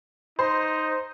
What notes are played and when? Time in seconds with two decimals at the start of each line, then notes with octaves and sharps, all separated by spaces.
0.39 D#4 C5 C6